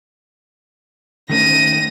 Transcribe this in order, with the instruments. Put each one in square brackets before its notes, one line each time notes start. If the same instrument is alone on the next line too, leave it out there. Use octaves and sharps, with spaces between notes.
[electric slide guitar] D#3 A3 C#4 [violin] A#6 D#7